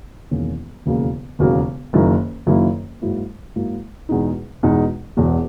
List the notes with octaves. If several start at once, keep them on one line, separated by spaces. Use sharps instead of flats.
E1 E2 D#3 A#3 C#4
E1 D#2 C#3 F#3 A#3
E1 D#2 C#3 F#3 A#3
F#1 F#2 D#3 A#3 E4
F#1 F#2 D#3 A#3 E4
G#2 F#3 A#3 E4
G#2 F#3 A#3 E4
E2 B2 G#3 D#4
E2 B2 G#3 D#4
E1 E2 B2